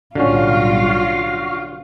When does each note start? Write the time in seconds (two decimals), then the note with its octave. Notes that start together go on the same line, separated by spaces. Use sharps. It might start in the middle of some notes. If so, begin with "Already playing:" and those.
0.15 B1 A2 D3 G3 C#4 F4 F#4 F5